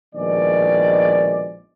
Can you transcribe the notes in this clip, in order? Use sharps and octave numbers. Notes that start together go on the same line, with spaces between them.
A#1 B2 D#3 G#3 D5